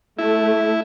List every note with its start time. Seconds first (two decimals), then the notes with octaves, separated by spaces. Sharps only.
0.19 A3 E4